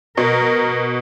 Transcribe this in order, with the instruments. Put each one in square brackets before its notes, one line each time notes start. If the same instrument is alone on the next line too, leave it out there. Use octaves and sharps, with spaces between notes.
[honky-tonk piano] B2 [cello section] A#4